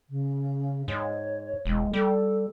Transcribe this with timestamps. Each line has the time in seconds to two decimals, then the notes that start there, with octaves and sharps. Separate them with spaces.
0.09 C#3
0.88 G#2 C#5
1.66 E1 G#3
1.93 G3 A4